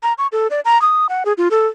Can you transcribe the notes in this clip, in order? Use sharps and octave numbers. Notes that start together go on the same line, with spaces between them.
A#5
C#6
A4
D5
A#5
D#6
F#5
G#4
F4
A4